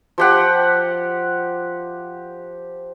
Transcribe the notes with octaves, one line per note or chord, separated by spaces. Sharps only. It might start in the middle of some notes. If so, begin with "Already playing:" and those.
F3 G4 F#5